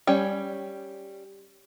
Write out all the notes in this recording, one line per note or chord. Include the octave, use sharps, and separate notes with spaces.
G3 C#4 C#5 G5